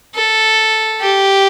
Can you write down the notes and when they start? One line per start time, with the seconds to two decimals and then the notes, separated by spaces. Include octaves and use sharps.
0.15 A4
1.01 G4